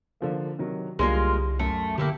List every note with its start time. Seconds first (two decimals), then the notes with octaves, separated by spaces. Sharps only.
0.21 D3 F3 A#3
0.59 C3 D#3 F#3
0.99 C2 D3 G3 G#3 A#3 F4
1.59 F#2 A3
1.98 D3 A#3 E4 G4